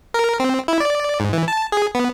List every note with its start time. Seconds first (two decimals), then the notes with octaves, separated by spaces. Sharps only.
0.14 A#4
0.40 C4
0.68 E4
0.80 D5
1.20 G#2
1.33 E3
1.48 A5
1.72 G#4
1.95 B3